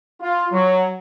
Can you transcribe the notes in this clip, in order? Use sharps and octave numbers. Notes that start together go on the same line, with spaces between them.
F4
F#3